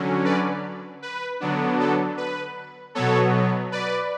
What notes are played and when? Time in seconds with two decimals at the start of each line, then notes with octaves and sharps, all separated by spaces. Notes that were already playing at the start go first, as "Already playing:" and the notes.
Already playing: D3 F#3 C#4
0.25 B4 D5
1.02 B4
1.40 D3 F#3 B3 D4
1.80 A4
2.17 B4
2.95 B2 F#3 B3 A4 C#5
3.72 B4 D5